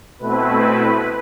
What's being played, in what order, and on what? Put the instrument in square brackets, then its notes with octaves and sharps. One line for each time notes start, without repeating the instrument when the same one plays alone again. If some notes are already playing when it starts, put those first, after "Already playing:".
[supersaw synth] B2 A3 C4 E4 B4